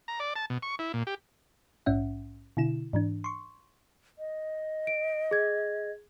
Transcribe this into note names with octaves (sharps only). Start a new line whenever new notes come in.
A#5
D5
A5
B2
C#6
E4
A#2
G4
A#1 G#2 C#4 E5 F#5
B2 D3 E4 E7
G#2 E3 D4
C6 C#6
D#5
D7
G#4 G#6